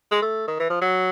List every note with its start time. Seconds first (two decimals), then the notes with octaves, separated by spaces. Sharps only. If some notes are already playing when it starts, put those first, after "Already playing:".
0.11 G#3
0.22 A3
0.48 D#3
0.59 E3
0.70 F3
0.81 F#3